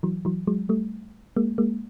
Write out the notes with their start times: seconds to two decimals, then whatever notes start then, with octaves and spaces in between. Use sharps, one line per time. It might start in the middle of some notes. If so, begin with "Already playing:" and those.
0.03 E3 F#3
0.25 E3 F#3
0.47 F#3 G#3
0.69 G3 A3
1.37 G#3 A#3
1.58 G#3 A#3